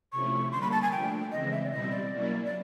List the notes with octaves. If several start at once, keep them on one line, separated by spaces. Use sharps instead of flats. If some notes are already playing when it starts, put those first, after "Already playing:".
C3 F3 A3 C#4 E4 C#6
D3 G3 A#3 C6
B5
A5
G#5
F3 A3 D4 G5
C#3 E3 G#3 C4 D#5
E5
D5
B2 G3 C4 E4 D#5
D5
F#3 A#3 C#4 E4
D5